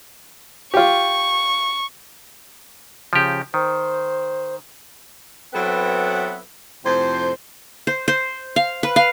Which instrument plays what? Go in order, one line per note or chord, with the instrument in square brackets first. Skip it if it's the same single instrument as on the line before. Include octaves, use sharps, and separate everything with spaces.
[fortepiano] F4 G4 [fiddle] C#6
[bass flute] C#3 [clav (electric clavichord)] F3 G4
[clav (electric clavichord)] D#3 [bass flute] C5
[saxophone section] F#3 B3 C4 E4 A4 B4
F2 A2 C3 C5
[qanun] C5
C5
F5
B4
F5